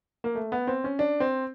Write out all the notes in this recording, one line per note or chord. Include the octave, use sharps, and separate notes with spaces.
A#3
A3
B3
C4
C#4
D4
C4